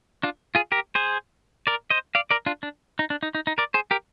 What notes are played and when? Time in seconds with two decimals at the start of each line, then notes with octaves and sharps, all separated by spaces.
0.23 D4 F4
0.55 F4 G#4
0.72 G4 A#4
0.95 G#4 C5
1.67 A#4 D5
1.90 C5 D#5
2.15 D5 F5
2.31 A#4 D5
2.46 D4 F4
2.63 D4
2.99 D#4
3.10 D4
3.23 D#4
3.35 D#4
3.47 D#4
3.58 A#4 D5
3.74 G#4 C5
3.91 G4 A#4